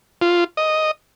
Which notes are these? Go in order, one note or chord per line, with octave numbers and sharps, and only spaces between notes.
F4
D#5